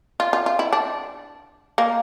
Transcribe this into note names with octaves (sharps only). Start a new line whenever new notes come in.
F4
F4
F4
E4
D4
A#3